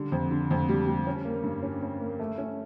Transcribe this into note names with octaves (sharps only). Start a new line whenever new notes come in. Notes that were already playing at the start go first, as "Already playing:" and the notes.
Already playing: D3 G3
F2
D3
F2
G3
G3
C#4
A#3
G2
C#4
C#4
A#3
A3
C#4